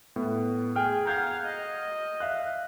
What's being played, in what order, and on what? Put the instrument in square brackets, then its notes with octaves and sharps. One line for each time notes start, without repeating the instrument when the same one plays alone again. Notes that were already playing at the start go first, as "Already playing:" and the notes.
[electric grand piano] A2 B3
[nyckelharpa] G#4 [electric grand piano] G5 F6
[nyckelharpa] F5 F#5 [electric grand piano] A#5 G6 G#6
[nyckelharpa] D#5
[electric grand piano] E5 F5 F#6